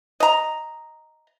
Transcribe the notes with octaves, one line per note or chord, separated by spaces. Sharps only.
D#5 A#5